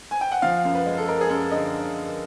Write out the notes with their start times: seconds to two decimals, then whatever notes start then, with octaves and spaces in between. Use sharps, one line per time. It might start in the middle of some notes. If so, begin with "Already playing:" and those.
0.11 G#5
0.21 G5
0.32 F#5
0.42 F3 F5
0.65 F#2
0.75 B4
0.86 G#3
0.98 A4
1.08 G#3 A#4
1.21 G#4
1.30 F#2 A4
1.51 D3 D#5